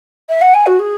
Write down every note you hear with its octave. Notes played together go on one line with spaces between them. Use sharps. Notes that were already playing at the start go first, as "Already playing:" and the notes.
E5
F#5
G#5
F#4
G#4